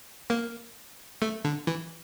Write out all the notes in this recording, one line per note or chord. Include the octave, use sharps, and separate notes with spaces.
A#3
A3
D3
E3